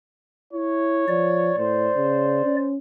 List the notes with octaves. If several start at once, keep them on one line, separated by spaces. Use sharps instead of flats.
E4 C#5
F3 D5
A2 C5
C#3
C#4